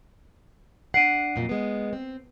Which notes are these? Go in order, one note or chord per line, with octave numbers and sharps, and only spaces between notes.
D4 F#5 C7 D7 D#7
F2 A#2 F#3
G#3 B3
C4